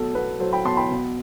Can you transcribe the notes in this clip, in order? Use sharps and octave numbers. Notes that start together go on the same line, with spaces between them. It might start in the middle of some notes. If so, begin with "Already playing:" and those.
Already playing: B2 F#3 A3 A4
B3 B4
F#3 A4 C5
G5 B5
B2 A5 C6
G5 B5
B2